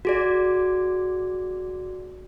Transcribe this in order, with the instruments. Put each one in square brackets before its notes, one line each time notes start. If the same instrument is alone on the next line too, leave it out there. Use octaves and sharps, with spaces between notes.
[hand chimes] F#4 G#4 D5